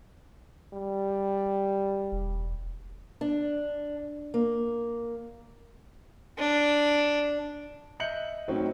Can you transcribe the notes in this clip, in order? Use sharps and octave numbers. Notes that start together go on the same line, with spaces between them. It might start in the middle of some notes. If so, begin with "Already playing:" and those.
G3
E1
D4
A#3
D4
D#5 E5 F#6 G6 C#7 F#7
A2 F#3 C4 C#4 D#4